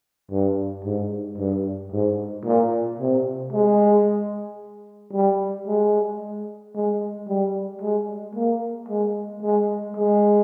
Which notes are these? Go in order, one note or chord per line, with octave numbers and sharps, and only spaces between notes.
G2
G#2
G2
G#2
A#2
C3
G#3
G3
G#3
G#3
G3
G#3
A#3
G#3
G#3
G#3